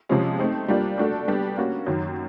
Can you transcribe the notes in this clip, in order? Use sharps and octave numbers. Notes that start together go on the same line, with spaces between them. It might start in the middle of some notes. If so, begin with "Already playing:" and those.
C3 F3 G#3 C#4
A3 C4 D#4
G3 A#3 D4 F4
A3 D4 F#4 A4
G3 B3 D4 G4
A#3 C#4 F#4
F#2 D#3 F#3